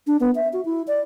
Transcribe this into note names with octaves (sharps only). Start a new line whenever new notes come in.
D4
B3
E5
F#4
E4
D5